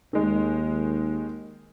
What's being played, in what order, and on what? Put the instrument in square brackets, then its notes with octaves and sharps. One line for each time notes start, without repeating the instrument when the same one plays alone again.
[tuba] D#2 [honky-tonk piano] D#3 G#3